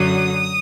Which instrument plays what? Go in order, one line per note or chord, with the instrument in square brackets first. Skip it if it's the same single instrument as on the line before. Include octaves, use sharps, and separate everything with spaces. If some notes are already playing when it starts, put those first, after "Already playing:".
Already playing: [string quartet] F#2 D3 F#3 D#6